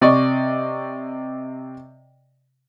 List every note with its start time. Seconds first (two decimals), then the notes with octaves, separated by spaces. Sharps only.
0.01 C3 D5 D#5 C#6